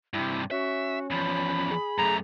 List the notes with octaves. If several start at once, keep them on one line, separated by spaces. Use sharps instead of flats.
G2 C3 E4
C#4 F#4 E5
E2 F3 B5
G#4
F#2 A3 A#5